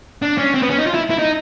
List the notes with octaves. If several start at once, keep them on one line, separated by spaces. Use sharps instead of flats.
D4
C#4
C4
B3
C#4
D#4
F4
E4
E4
D#4